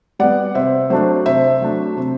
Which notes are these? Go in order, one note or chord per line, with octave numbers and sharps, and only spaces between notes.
G3 B3 D5 F#5
C3 C5 E5
F#3 A3 D4 C5
C3 C5 E5
F#3 A3 D4
C3